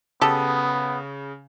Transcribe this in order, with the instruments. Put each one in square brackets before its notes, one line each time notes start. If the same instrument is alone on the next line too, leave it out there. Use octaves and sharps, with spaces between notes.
[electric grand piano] C#3 D#6 [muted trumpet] B3 [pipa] G4 A4